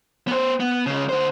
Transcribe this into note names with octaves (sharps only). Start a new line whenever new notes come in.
B3 C5
B3
C#2 C#3
D3 C5